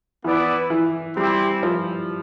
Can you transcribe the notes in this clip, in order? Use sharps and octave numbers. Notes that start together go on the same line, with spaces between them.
E3 B3 E4 B4 D5
E3
G3 C4 E4 G4
F3